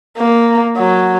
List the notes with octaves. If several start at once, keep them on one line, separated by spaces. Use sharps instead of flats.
A#3
F#3